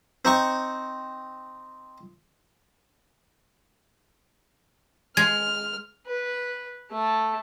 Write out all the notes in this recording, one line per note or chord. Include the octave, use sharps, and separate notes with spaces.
C4 D#4 C#6
G#3 F6 G#6
B4
A3 A5